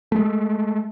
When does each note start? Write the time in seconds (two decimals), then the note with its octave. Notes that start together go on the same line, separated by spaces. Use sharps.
0.12 G#3 A3